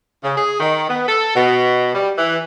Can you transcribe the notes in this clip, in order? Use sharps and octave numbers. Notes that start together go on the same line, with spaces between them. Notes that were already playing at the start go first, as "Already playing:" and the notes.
C#3
G#4
D#3
B3
A4
B2
G3
E3